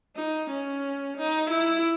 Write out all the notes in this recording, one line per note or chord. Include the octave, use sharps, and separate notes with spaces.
D#4
C#4
D#4
E4